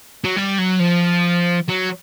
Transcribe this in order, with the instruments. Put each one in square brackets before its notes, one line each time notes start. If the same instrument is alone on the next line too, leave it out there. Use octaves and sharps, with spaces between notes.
[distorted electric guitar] F#3
G3
F#3
F3
F#3